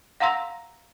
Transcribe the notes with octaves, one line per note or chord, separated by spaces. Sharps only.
F5 F#5 A#5 C6 E6 A#6